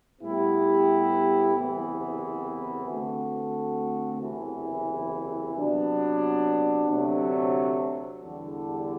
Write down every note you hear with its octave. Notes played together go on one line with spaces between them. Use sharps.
A2 G3 B3 E4 G4
F#1 E2 C3 E3 B3
D3 A3 C4 F#4 A4
F#1 E2 C3 E3
C3 F#3 B3 D4
D2 C3 F#3 A3 D4
E2 D3 G3